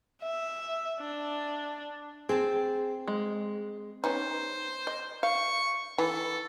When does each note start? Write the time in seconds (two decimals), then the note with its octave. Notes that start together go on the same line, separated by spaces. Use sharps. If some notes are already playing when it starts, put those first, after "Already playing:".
0.23 E5
1.00 D4
2.29 C4 G#4 G5 A5
3.08 G#3
4.04 B3 C#4 D#4 C5
4.87 D#5
5.23 F5 C#6
5.98 E3 A4